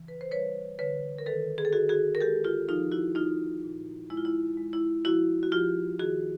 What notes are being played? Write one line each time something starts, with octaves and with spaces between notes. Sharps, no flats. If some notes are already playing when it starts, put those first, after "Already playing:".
Already playing: C#3 E3
B4
C5
G3 B4 C#5
D3 B4 C#5
A#4
D#3 A4 B4
G#4
A4
D#3 F#4 G#4
F#4 G#4
A#4
G#3 G4 A4
F4 G4
F3 D#4 F4
E4 F#4
D#4 F4
A#2
G#3 E4
F4
E4
G#3
E4
F3 E4 F#4
F#4
F3 F4 G4
D#3 F#4 G#4